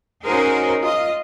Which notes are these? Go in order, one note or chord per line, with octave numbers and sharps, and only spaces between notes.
C#4 D#4 F#4 G#4 A#4 C5
F4 D#5